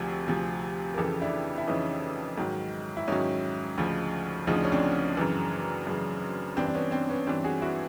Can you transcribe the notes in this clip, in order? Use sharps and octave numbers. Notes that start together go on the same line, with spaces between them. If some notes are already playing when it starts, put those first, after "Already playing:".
Already playing: D2 C3 F3 G#4
D2 C3 F3
A#4
F2 C#3 E3 G4 A4
D4 E4
E4
F2 C#3 E3 C#4 D#4
G#2 D#3 F#3
E4
G#2 D#3 F#3 C#4 D#4
D2 C#3 F3
D2 C#3 F3 D#4
D4
C#4
C4 D4
F#2 C#3 E3
F#2 C#3 E3
G2 E3 C4 D4
D4
B3 C#4
C4 D4
B3 C#4
G2 E3 C4 D4
F#4 G#4
E4 F#4